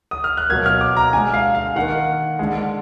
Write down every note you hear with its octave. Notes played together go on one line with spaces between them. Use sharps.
D#6
F6
F#6
B2 F#3 A#3 G#6
F6
D6
A#5
D3 G#3 G#5
F5
F5
D#3 A#3 F#5
D3 G#3